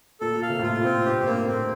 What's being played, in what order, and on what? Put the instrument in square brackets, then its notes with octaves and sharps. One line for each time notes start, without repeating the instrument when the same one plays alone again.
[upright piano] A#2 [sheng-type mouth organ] A4
[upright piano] A#2
[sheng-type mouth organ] F5
[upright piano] C3
A2
[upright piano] A#2 [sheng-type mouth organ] F4
[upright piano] A2 [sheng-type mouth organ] C4
[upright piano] G2 [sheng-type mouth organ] G4
[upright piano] A2
[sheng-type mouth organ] A#3
[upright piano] G2
[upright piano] A2 [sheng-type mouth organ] C4